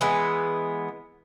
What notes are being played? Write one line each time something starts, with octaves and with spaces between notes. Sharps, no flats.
E3 G#3 B3